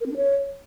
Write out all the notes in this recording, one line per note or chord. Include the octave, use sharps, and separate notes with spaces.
A#4
C4
D4
C#5